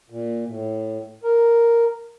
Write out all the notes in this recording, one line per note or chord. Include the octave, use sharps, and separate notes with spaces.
A#2
A2
A#4